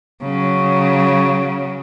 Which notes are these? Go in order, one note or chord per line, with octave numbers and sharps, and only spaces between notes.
C#3 F#3